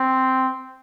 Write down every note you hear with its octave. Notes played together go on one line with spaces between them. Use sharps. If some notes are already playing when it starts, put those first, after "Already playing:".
Already playing: C4